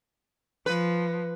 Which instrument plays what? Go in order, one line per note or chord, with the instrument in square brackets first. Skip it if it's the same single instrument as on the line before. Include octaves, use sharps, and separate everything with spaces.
[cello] F3 [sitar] B4